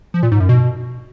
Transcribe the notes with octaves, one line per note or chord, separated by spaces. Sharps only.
F3
A#2
G#2
F#2
B2